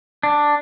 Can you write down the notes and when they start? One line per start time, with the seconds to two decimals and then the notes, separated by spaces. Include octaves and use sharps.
0.23 D4